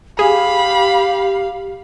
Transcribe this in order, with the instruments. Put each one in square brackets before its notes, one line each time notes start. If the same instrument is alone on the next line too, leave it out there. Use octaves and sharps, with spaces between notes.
[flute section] G4 [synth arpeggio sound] G#4 [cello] F5 [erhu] B5